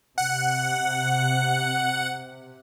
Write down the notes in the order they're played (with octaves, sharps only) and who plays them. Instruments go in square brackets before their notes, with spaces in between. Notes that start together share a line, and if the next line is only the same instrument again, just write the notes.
[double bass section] C3 [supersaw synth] F#5